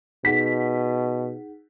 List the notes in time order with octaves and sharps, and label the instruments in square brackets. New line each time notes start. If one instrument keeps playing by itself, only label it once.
[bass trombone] B2 [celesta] D#4 G#4 F#5 [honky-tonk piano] B6